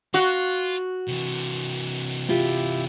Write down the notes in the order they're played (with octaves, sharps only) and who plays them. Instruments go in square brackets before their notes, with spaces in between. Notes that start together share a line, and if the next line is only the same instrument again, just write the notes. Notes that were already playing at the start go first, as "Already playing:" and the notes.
[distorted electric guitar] F4 [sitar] F#4
[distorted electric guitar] C3 E3
[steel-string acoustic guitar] E4 F4 G4